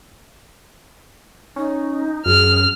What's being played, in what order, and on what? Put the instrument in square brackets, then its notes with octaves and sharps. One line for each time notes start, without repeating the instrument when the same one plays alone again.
[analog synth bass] C#4 [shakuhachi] D#4
[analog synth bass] F#2 [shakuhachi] G#4 [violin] F6